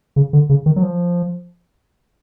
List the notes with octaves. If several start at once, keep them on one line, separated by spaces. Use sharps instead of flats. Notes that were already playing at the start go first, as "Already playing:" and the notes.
C#3
D3
C#3
D#3
F#3
F3